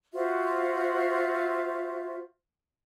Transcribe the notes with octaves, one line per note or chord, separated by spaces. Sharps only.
F4 F#4 C5 E5